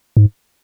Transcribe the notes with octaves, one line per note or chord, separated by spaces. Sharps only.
G#2